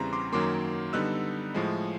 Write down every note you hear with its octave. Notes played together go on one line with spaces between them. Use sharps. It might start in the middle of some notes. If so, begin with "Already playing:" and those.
Already playing: E2 C#3 E3 G3 C4 A#5 C6
C6 D6
F#2 D#3 F#3 A#3 C6 D6
D3 G3 B3 D#4 E6 F#6
A2 F3 G#3